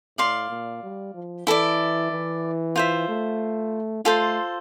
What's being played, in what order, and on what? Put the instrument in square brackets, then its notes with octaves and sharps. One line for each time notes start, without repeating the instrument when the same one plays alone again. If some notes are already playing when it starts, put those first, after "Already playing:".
[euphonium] A2 [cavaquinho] D5 F5 C6
[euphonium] A#2
G3
F3
[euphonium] E3 [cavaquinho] E4 A4 D5
[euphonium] E3
[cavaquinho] F4 C5 E5
[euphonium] A3
[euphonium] A3 [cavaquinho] F4 A4 C5